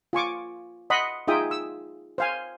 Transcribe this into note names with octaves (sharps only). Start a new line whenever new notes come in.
F4 G#5 C#6 D6
D#5 F#5 B5 C6 D#6
D#4 F4 G#4 E5 G5 D#6
E6
C5 F5 G#5